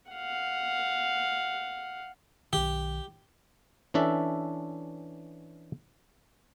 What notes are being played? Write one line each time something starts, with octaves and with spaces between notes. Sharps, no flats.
F5 F#5
B1 D#3 G4
E3 C#4 D4 A4 E5